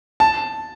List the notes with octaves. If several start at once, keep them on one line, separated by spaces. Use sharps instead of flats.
A5